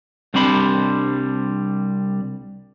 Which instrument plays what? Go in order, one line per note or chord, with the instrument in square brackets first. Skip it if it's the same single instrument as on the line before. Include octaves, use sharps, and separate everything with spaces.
[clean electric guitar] C2 G3 C4 D4 C5 B5